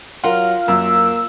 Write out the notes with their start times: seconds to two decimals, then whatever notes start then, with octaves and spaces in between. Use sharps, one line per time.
0.24 F#3 F4 A#4 F#5
0.68 F#2 A#3 E6